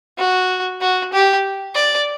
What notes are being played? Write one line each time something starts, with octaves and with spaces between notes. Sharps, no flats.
F#4
F#4
G4
D5